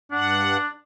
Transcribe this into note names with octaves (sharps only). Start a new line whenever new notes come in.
G2 D4 F#5